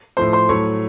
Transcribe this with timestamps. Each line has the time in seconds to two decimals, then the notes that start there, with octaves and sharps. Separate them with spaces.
0.17 A2 F3 A3 C5 C6
0.33 C5 C6
0.49 A2 F#3 A3 C#5 C#6